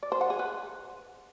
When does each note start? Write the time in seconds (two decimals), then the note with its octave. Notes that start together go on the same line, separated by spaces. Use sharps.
0.03 D5
0.12 C5
0.21 F#5
0.30 G#4
0.39 B4